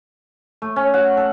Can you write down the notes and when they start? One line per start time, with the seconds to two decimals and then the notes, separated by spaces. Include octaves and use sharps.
0.62 A3
0.76 C#4
0.94 F#5
1.17 A4